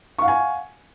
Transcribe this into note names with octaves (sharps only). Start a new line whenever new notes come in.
F5 F#5 G#5 C#6